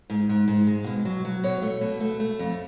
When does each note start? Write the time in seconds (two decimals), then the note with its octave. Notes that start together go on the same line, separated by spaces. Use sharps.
0.10 G#2
0.29 G#2
0.48 G#2
0.67 G#3
0.86 B2
1.05 F#3
1.25 F#3
1.44 B2 C#5
1.62 A3
1.81 B2
2.00 A3
2.20 A3
2.39 F2